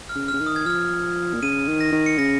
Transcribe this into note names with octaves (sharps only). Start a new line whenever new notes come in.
F6
C#3
C#3 F6
D#3
D#6
G#6
F3 F6
A#2
C#3 D#7
D#3
A#6
D#3
C#7
C#3 A#6